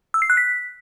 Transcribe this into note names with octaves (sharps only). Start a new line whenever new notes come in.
E6
C7
F#6
B6